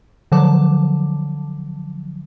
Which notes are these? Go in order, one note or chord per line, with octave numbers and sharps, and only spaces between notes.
D3 F3 F#3 A5 D6